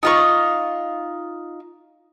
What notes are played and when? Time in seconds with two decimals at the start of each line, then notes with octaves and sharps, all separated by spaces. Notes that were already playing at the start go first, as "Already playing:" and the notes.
0.03 D#4 F4 C#6